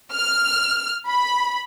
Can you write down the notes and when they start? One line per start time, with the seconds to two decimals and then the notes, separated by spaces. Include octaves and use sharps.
0.13 F6
1.07 B5